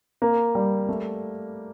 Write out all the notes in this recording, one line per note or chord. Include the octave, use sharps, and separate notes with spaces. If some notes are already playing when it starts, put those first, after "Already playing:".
A#3
G3
A3